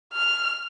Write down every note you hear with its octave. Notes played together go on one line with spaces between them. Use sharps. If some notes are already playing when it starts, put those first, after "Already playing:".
F6